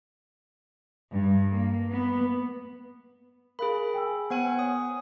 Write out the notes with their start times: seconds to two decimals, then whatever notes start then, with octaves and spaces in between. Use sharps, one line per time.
1.11 G2
1.52 A#3
1.90 B3
3.59 G#4 A#4 F5 B5 F#6
3.94 G5 G#5 E6
4.30 B3 C5 F#5 G#5 F#7
4.59 C#5 D#6